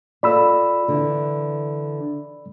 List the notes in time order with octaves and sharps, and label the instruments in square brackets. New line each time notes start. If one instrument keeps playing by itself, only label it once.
[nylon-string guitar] F4 A4 D#5 [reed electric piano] D5 B5 E6
[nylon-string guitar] D3 E3